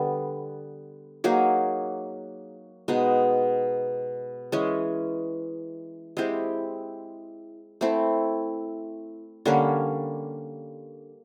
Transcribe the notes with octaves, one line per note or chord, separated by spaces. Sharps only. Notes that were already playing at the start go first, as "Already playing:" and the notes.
Already playing: D3 G3 B3
F#3 A#3 D#4 G#4
B2 G#3 B3 D#4
E3 G#3 C#4
G#3 C4 E4 G4
A3 C4 E4
D3 G3 A#3 C#4